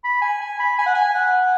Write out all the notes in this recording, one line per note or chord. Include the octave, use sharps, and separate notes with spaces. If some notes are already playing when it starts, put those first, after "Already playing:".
B5
G#5
G#5
B5
G#5
F#5
G#5
F#5